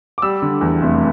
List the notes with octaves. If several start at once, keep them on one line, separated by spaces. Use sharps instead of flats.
D6
G3 E6
D3
E2
F1